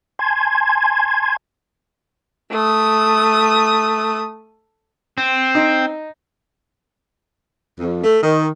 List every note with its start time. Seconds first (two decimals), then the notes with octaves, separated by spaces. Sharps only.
0.19 G#5 A5 C6 G#6
2.51 A3 D#6
5.18 C4
5.55 D#4
7.80 F2
8.04 A3
8.23 D#3